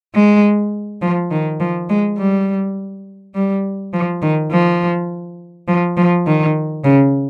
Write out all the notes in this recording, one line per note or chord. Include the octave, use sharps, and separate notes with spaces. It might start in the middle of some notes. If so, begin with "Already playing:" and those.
G#3
F3
D#3
F3
G#3
G3
G3
F3
D#3
F3
F3
F3
D#3
C#3